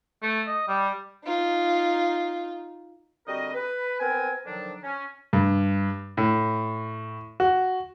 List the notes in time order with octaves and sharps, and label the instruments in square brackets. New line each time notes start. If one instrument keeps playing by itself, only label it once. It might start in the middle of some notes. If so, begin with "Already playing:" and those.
[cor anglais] A3
D#5
G3
[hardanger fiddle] D#4 F4
[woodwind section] D3 G3 C4 F#4 A#4 D#5
B4
B3 C4 A#4 B4 G#5
D3 D#3 F3 F#3 D4
C#4
[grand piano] G2
A2
F#4